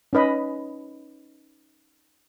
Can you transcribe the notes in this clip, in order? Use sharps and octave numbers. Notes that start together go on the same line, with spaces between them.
C#4 D#4 B4 D#5 B5